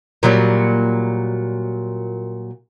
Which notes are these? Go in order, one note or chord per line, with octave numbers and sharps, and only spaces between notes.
A#2 F#3 G3